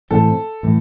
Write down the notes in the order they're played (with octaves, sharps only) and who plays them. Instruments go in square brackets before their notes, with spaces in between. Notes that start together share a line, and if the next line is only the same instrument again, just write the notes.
[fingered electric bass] A2 E3 A3 C4 [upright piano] A4
[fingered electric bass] A2 E3 A3